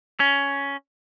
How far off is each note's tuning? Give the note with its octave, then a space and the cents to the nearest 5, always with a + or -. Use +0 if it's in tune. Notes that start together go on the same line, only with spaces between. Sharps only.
C#4 +10